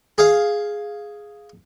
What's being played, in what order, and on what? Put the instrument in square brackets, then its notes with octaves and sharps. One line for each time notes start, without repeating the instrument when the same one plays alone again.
[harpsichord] G#4 F5